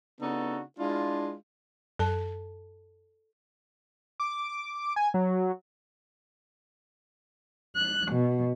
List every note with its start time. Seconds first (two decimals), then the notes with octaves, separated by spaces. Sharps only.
0.21 C#3 B3 D4 D#4 F#4 A4
0.79 G#3 D4 E4 F4
1.99 F#2 A4 A5
4.20 D6
4.96 G#5
5.14 F#3
7.77 F#6
8.11 B2